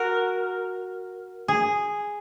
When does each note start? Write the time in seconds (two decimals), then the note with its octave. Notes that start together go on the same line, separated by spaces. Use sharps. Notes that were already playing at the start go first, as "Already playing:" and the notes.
Already playing: F#4 A#4
1.48 G#4